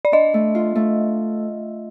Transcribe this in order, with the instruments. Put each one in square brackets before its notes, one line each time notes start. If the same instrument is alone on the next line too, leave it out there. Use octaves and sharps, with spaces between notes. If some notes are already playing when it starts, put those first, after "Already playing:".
[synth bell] D5
[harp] D4 [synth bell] D#5
[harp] A3
F4
A3